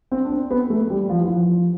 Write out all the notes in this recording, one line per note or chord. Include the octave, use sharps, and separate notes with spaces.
C4
D4
C4
B3
A3
G3
F3
E3
F3